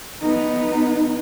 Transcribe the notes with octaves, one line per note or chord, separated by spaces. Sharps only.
B3 D#4